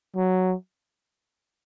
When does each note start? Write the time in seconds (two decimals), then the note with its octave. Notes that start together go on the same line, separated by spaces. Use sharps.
0.16 F#3